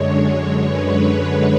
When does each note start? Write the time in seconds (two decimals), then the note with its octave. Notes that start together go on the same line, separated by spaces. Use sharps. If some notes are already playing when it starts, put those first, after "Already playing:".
Already playing: F#2 D3 G#3 C#5
0.61 B4
1.09 C#5